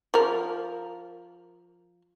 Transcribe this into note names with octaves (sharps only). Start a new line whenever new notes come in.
F3 A#4